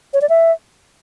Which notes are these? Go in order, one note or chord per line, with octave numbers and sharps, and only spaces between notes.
C#5
D5
E5